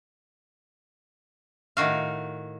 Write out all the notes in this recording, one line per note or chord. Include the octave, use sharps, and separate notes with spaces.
A2 D#3 F#4 F5